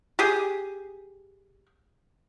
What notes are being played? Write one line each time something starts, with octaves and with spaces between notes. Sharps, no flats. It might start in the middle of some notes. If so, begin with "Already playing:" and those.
G4 G#4